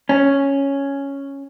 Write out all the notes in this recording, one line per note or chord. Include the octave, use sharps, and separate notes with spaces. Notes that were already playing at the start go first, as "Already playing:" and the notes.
C#4